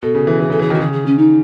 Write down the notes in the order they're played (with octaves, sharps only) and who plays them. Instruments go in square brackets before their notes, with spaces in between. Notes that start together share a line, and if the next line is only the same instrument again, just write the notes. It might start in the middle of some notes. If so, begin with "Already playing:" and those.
[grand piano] B2 [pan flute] A4
[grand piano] C#3
E3
[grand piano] E3 [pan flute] G#4
[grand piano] C#3 [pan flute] A4
[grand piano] E3 [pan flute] G#4
[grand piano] D#3
[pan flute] F#4
[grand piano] C#3 [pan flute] G#4
[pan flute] G#4
C#4
D#4